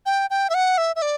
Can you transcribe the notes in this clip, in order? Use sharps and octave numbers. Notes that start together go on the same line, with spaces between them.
G5
G5
E5
F#5
E5
E5
D5